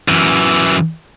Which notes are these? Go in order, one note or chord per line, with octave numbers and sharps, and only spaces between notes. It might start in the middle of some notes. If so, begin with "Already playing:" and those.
F#2 E3